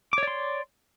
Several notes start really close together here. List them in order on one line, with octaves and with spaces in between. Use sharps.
D6 C#5 D5 C6